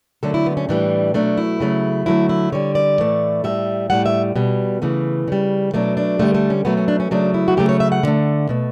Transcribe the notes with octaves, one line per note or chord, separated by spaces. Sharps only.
D3 F#3 A3 A4
E4
B3
C#4
A2 E3 G3 D4
B2 F#3 A3 D4
E4
C#3 F#3 A3
D3 F#3 A3 E4
E4
D3 G3 C#5
D5
A2 E3 A3
A2 G3 E5
A2 G3 F#5
E5
B2 G3
C#3 E3 A3
C#3 G3
B2 F#3 A3 D4
D4
D3 G3 A3
A3
C#4
B2 F#3 A3 B3
C#4
D4
C#4
C#3 F#3 A3 D4
E4
F#4
C#3 F#3 A3 G4
C#5
E5
F#5
D3 A3
B2 A3